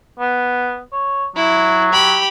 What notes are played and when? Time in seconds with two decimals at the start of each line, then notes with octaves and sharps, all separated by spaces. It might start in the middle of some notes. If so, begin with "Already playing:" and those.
0.20 B3
0.93 C#5
1.36 F#3 E4
1.92 G4 B5